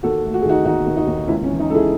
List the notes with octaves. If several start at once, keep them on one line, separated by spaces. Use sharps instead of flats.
D#2 F#4 A4
A3
F#4
G#4
D#3 D#4 F#4
D#3 D#4 F#4
D#2
D#4 F#4
D#2
C#2 C#4 E4
C#4
E3
D#4
C#2 A4
E4 G#4